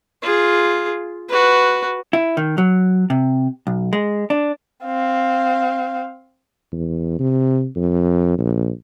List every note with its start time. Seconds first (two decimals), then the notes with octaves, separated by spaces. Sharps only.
0.22 F4 G#4
1.29 F#4 B4
2.13 E4
2.37 D#3
2.58 F#3
3.10 C3
3.67 B1
3.93 G#3
4.30 D4
4.84 C4 F5
6.73 E2
7.19 C3
7.76 F2
8.38 A#1